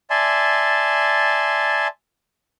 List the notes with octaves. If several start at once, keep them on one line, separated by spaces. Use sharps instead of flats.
D5 E5 G#5 A5 C6